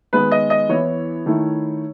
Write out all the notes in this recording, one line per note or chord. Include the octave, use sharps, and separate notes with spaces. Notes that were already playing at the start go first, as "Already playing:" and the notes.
D#3 G#3 B3 B4
D#5
D#5
E3 B3 E4 C#5
D#3 A3 E4